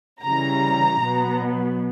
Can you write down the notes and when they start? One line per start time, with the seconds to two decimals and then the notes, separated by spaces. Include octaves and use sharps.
0.22 C#3 E3 G3 A#5
1.02 B2 F#3 B3